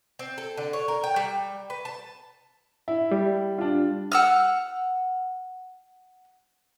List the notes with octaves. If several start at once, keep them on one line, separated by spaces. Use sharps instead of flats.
C4
A4
D3
C#5
A#4
G5
G3
B4
A5
E4
G3
D4 F4
F#5 E6 F6